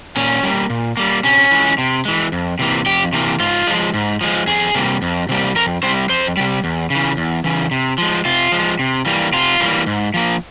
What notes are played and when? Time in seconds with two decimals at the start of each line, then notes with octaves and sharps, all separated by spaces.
0.17 A#2 C#4
0.43 G3 A#3
0.70 A#2
0.97 G3 A#3
1.24 C3 C#4
1.51 E3 G#3
1.78 C3
2.05 E3 G#3
2.32 F2
2.59 C3 E3 A#3
2.86 F2 G4
3.13 C3 E3 A#3
3.40 G#2 F4
3.67 F3 G#3
3.94 G#2
4.21 F3 G#3
4.47 F2 G#4
4.75 C3 G3 A#3
5.02 F2
5.29 C3 G3 A#3
5.55 F2 A#4
5.83 C3 G3 C5
6.09 F2 C5
6.37 C3 G3
6.64 E2
6.90 C#3 E3
7.17 E2
7.44 C#3 E3
7.71 C3
7.98 F3 G#3
8.25 C3 F4
8.52 F3 G#3
8.79 C3
9.06 E3 G3 A#3
9.33 C3 F4
9.60 E3 G3 A#3
9.86 G#2
10.14 F3 A#3